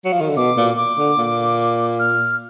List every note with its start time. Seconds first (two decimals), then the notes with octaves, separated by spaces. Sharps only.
0.05 F#3
0.13 F3
0.21 D#3
0.29 D3
0.37 B2 D6
0.57 A#2
0.77 D6
0.98 D3
1.18 A#2
1.99 F6